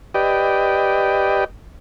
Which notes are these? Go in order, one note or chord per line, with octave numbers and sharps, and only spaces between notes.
G4 B4 D5 D#5 G5